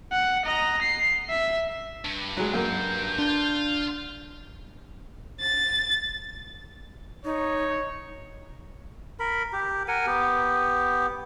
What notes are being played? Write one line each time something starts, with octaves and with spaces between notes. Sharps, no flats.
F#5
D#5 A#5
C7
E5
G2
F#3 G#3
F#2 A#3 G6
D4 F4
A6
D#4 C#5
A#4 B5
G4
A#4 F#5 G#5
B3 G4